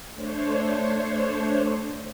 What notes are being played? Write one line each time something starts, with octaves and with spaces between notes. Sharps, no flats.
A3 D4 C5 C#5